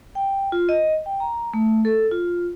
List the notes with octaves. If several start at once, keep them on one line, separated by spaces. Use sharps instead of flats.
G5
F4
D#5
G5
A#5
A3
A4
F4